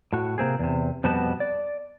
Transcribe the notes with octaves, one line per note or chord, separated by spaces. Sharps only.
A2 F#4
C3 A#3 C4 G#4
E2 C3
F2 B2 G3 B3 F#4 A5
D5